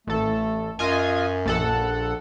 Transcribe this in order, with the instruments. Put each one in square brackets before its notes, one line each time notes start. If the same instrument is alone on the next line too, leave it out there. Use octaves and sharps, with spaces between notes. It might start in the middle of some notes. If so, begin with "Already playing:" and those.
[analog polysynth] A1 A4 [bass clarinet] A3
[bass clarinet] F#2 [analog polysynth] F4 D#5 G#5
[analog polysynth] A#1 A4 F#5